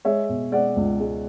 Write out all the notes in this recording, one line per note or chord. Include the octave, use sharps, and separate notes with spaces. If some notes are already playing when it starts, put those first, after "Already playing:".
G#3 C#5 E5
B2
G#3 D5 F#5
C#2
G#3